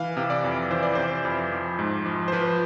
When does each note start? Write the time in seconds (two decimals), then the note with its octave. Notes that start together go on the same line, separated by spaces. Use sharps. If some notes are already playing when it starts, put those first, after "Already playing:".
Already playing: E3 F5
0.17 C3
0.30 D5
0.44 F2
0.70 E3 C5
0.83 D5
0.95 C3 C5
1.25 F2
1.52 F3
1.79 G#2
2.06 F3
2.28 C5
2.32 F3 B4